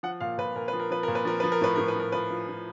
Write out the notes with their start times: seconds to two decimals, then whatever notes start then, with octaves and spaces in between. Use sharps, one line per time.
0.03 F3 F#5
0.20 A#2 F5
0.38 A#2 B4
0.56 A#2 A#4
0.68 B4
0.73 F3
0.80 A#4
0.91 F3 B4
1.03 A#2 A#4
1.15 B4
1.25 F3 A#4
1.40 F3 B4
1.52 A#4
1.61 A2 B4
1.76 A2 A#4
1.88 B4
1.96 F3 A#4
2.12 F3 B4
2.30 F3
2.48 F3